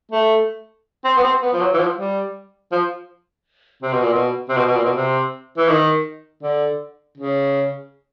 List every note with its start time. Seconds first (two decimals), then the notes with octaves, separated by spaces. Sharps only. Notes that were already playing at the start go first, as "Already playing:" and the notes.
0.11 A3
1.04 C4
1.17 B3
1.23 C4
1.42 B3
1.53 F3
1.61 F#3
1.73 E3
1.79 F3
1.97 G3
2.72 F3
3.83 C3
3.93 B2
4.03 A#2
4.14 B2
4.49 C3
4.57 B2
4.67 B2
4.76 A#2
4.85 B2
4.95 C3
5.57 E3
5.69 D#3
6.43 D3
7.18 C#3